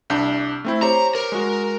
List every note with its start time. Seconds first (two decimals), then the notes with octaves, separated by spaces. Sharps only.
0.10 C2 D4 G6
0.65 A3 C4 E4
0.82 G4 C5 C#5 A#5
1.15 A#4
1.32 G#3 F#4